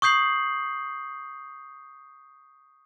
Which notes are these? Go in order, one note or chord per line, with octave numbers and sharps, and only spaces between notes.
C#6 D#6 G6 C7 F#7